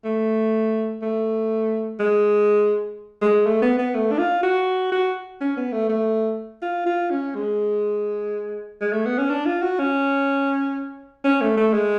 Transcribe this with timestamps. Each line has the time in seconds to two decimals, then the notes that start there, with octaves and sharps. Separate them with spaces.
0.04 A3
1.02 A3
2.00 G#3
3.22 G#3
3.46 A3
3.62 B3
3.78 B3
3.95 A3
4.11 D4
4.19 F4
4.43 F#4
4.92 F#4
5.41 C#4
5.57 B3
5.73 A3
5.89 A3
6.62 F4
6.86 F4
7.11 C#4
7.35 G#3
8.81 G#3
8.93 A3
9.06 B3
9.18 C#4
9.30 D4
9.46 F4
9.62 F#4
9.79 C#4
11.24 C#4
11.41 A3
11.57 A3
11.73 G#3